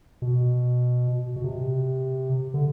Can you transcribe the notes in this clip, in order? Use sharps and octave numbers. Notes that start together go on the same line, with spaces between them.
B2
B2
C3
D3